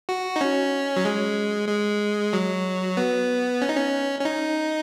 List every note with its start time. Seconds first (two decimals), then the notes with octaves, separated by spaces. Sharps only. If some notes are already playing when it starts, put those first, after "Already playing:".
0.09 F#4
0.36 D#4
0.41 C#4
0.96 F#3
1.05 G#3
1.69 G#3
2.33 F#3
2.97 B3
3.62 C#4
3.69 D#4
3.77 C#4
4.20 C#4
4.25 D#4